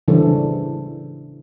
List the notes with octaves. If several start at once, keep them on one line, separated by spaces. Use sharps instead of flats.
C#3 E3 G3 D4 A4 C5